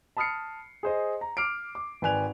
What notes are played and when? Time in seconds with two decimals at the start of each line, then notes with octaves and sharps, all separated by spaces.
0.17 A5 B5 D#6 F6 C7 C#7
0.83 G#4 C5 D#5
1.21 A#5
1.37 D6 F6 C7 D7
1.75 D6
2.02 G#1 B4 D5 G#5 F#6 F7